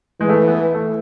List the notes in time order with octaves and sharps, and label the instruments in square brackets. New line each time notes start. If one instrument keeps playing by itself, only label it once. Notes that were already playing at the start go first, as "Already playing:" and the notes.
[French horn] E3 [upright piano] G#3
[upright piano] A3
B3
A3